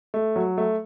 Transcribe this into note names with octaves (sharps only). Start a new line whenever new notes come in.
A3
F#3
A3